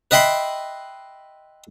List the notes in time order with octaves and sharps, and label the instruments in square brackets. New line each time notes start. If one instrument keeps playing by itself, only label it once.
[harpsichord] B4 D#5 E5 G5 B5 C6